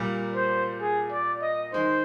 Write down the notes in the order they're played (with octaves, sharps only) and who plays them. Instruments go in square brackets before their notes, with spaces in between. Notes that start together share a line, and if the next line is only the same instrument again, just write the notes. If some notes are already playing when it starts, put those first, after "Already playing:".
Already playing: [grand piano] A#2 G3 A#3
[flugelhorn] C5
G#4
D5
D#5
[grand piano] D#3 G#3 D#4 [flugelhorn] C5